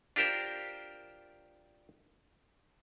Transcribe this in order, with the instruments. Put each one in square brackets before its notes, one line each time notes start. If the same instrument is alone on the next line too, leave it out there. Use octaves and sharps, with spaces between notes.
[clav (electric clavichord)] D4 F4 G4 A#4 C5